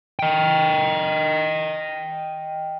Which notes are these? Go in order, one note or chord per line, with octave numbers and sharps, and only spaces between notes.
D#5 G5